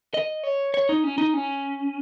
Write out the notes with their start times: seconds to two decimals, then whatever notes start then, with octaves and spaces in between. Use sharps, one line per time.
0.14 D#5
0.43 C#5
0.74 C#5
0.89 D#4
1.04 C#4
1.18 D#4
1.34 C#4